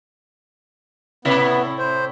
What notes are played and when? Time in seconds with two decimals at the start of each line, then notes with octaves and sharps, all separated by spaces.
1.25 A2 C3 B3 E4
1.79 C5